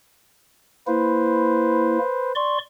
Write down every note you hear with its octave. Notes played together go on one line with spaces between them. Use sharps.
A#3 E4 B4 C5
D5 C6 C#6